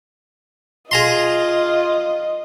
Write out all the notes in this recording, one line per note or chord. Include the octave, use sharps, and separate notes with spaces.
F4 G#4 D#5 A#5 C6